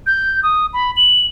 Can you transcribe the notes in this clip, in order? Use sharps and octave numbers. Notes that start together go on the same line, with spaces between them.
G6
D#6
B5
F#7